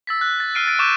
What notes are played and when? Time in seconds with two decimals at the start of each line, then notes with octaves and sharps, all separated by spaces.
0.07 E6 A6 B6
0.21 F#6
0.40 A6
0.55 F6 C7 D7 D#7
0.67 A6 D7
0.79 C#6 D6 G6 A6 D#7 E7